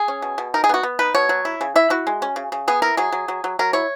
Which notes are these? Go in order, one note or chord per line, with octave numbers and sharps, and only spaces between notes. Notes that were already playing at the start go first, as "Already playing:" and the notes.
Already playing: G#4
C#4
B2
B2
D#4 A#4
G#4
B3 F#4
B3
D#4 B4
B2 C#5
F#3
E4
C#3
E4 E5
E4 F#4
G#3
C#4
C#3
C#3
B3 G#4
E4 A#4
F#3 G#4
F#3
F#3
F#3
F#3 A#4
E4 C#5